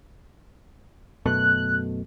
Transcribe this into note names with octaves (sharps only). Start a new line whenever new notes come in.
F#2 B2 A3 F#6